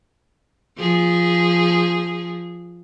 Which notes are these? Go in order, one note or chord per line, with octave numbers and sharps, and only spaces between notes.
F3 G#4